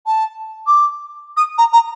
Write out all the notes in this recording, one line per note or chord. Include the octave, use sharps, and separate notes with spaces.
A5
D6
D#6
A#5
A#5